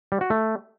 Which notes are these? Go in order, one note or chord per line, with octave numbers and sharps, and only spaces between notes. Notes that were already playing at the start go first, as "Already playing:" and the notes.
G3
F#4
A3